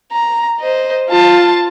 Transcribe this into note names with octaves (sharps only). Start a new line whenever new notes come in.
A#5
C5 D#5
F4 A5